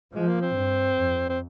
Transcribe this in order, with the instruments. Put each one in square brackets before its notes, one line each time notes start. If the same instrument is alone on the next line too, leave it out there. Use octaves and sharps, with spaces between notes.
[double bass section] F3 [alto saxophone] G#3
[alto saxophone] A#3
C4
[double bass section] G2
F2
[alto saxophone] C4